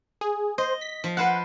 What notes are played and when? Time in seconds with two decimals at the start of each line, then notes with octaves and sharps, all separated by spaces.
0.21 G#4
0.58 C5 D#5
0.81 B6
1.04 F3
1.17 B4 C5 F5 F#5